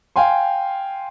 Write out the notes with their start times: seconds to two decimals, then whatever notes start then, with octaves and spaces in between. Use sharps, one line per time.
0.16 F5 G5 G#5 C6